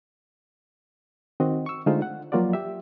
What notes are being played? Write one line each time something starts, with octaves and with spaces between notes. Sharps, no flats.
D#3 C4 F#4 D#5
C#6 E6
D3 G#3 A3 D#4 F4 C5
F#5
F3 F#3 A#3 F4 F#4 D5
G4 E5